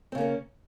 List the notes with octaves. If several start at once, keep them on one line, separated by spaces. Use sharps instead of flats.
C#3 A#3 C4 C#4